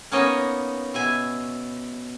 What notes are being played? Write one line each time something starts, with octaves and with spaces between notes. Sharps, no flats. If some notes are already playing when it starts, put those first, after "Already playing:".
A#3 B3 C#4 D#4 C#5 D#5
B2 E5 G#5